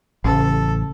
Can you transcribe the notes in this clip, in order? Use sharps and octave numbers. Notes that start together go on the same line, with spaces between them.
A1 C#3 C#4 A4